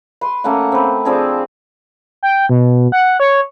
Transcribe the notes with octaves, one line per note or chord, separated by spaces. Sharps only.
B4 C6
A3 A#3 C#4 F#5
C4 B4
F3 C4 D4 G#4
G5
B2
F#5
C#5